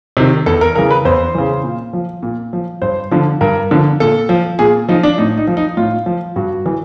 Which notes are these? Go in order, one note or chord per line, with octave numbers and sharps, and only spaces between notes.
C3 D#3
E2 A4
A#4
C#3 E3 A#4
B4
E2 C5
C#3 E3
A#2
F3
A#2
F3
G2 C5
D3 F3
G2 A#4
D3 F3
A#2 A4
F3
A#2 G#4
F3 D#4
D4
A2 D#4
D#4
F3
D#4
A2 F4
F3
G2 F#4
E3